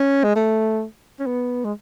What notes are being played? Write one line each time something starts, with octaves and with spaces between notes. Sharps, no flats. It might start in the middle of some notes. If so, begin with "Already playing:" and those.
Already playing: C#4
G#3
A3
C#4
B3
G#3